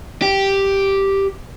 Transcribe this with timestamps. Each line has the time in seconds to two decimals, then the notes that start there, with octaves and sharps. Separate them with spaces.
0.22 G4